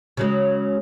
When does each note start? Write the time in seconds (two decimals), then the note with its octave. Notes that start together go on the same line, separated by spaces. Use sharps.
0.17 C#3 F#3 G#3